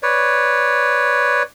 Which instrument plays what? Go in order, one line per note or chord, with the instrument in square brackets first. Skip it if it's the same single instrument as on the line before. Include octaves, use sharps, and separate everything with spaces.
[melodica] B4 C#5 D5